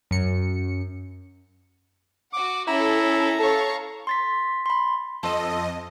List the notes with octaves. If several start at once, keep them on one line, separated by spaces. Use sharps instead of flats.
F#2 C#7
F#4 F#5 D6
C#4 E4 A4 A#5
A4 C#5 F5 C#6
C6 A6 B6
B5 C6
F2 C4 A4 D#5